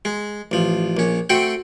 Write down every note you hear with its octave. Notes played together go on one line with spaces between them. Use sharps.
G#3
A1 F3
A#1 C#4
A3 C4 F#4 G5